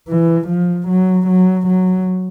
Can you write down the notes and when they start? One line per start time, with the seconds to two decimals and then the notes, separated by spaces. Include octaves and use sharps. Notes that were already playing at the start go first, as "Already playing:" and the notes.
0.08 E3
0.48 F3
0.88 F#3
1.27 F#3
1.67 F#3